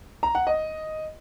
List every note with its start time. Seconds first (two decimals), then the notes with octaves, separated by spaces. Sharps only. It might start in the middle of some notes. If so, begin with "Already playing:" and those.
0.23 A#5
0.35 F#5
0.47 D#5